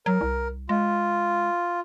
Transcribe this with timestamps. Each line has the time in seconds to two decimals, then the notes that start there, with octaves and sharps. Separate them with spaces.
0.06 F#3 A#4
0.21 C2
0.69 G#3 F4